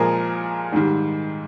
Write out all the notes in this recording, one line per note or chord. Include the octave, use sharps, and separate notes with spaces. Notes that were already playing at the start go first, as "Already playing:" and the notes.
Already playing: A#2 F3 G#3 G#4 A#4
G#2 D#3 G3